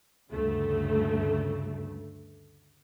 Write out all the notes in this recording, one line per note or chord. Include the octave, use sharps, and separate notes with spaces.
D2 G2 C#3 A3